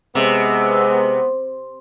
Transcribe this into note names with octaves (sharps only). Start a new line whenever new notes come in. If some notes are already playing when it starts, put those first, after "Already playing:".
C3 G#3 B3